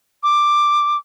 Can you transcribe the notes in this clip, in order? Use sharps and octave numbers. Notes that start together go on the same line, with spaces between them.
D6